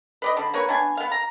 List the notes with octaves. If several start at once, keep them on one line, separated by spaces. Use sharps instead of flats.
B4 D5 D#5
D3 B5
A#3 B4 C#5
B3 D4 G#5
B3 F5
A#5